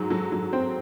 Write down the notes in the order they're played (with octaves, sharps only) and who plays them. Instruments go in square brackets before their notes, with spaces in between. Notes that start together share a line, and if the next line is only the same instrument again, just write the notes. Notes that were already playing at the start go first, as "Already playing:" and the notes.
Already playing: [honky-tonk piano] G#2 F#3 [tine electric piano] G#4
[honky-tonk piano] F#3 [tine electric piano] A4
[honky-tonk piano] F#3
[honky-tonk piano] C4 [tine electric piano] C5